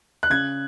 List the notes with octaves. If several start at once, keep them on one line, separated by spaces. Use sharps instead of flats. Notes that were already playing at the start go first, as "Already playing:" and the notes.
F#6
C#3 G#6